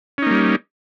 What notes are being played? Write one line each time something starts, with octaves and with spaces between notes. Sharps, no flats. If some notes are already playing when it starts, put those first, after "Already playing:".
G3 A#3 C#4 D#4